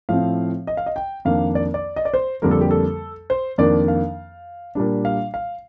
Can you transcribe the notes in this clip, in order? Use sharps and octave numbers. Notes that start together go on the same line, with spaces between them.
A2 F3 C4 F5
D#5
F5
D#5
G5
F2 D#3 A#3 D4 F5
D5
D5
D#5
D5
C5
F2 D3 G3 A#3 A#4
A4
G4
A4
C5
F2 D#3 A#3 D4 D5
F5
A#2 G3 D4
F5
F5